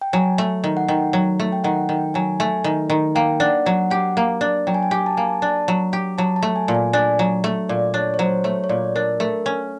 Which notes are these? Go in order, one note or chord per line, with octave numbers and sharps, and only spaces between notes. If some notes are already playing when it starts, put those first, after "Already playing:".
G5
F#3 G#5
A3
D#3
F#5
D#3 G5
F#3
A3
G5
D#3 F#5
D#3 G5
F#3 G#5
A3 G#5
D#3
D#3
A#3 G5
D4 F#5
F#3 F#5
G4 F#5
A#3
D4
F#3 G5
G#5
G5
G4 G#5
A5
A#3 G#5
D4 A5
F#3
G4
F#3 A5
A5
A3
G#5
A#2
G#5
D4 G#5
F#3
A3
A#2 D5
D4 C#5
C#5
F#3 C5
A3 C#5
C#5
A#2 D5
D4 A#4
A3 A#4
C#4